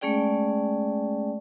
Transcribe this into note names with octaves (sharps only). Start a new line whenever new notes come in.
G#3 A3 C#4 G#4 D5 G5